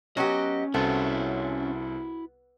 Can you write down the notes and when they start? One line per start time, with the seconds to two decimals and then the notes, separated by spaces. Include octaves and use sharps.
0.17 F#3 B3 C#4 G4 D#5
0.74 C2 B3 E4 F#4 A4 C5